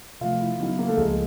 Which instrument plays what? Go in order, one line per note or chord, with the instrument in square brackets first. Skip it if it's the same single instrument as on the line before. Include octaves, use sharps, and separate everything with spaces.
[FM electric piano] C3 F3 A3 [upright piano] F4
[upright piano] E4
[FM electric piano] C#3 F#3 B3 D#4 F#4 [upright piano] E4
[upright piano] A#3
A3
[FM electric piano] C#2 C#3 F3 [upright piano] G#3